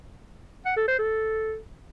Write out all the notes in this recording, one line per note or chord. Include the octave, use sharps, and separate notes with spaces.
F#5
A4
C5
A4